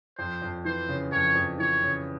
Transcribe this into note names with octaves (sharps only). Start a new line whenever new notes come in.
F2 C5
F2
E3 C5
C#3
F2 C#5
F2
E3 C#5
C#3